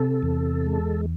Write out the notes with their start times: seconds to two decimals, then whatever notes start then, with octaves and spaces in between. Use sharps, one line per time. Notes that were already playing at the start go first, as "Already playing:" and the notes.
Already playing: C3 A4
0.23 E2
0.66 G#3